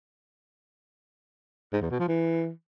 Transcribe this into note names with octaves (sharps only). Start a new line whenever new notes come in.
G#2
E2
B2
F3
E3